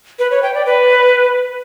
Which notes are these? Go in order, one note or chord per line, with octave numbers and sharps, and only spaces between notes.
B4
C#5
G5
D5
B4